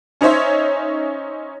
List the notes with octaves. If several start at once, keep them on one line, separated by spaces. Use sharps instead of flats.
C#4 D#4 C5 C#5 E5